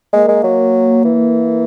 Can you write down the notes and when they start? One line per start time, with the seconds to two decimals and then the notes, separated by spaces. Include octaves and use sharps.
0.13 G#3 A#3
0.29 G#3
0.44 F#3
1.05 E3